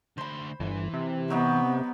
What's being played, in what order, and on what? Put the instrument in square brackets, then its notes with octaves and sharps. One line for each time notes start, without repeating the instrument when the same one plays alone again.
[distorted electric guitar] D2 C6 [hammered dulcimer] C5 B5
[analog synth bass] G1 [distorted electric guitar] E3
[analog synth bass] C3
[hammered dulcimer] F#3 D#4 G4 [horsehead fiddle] B3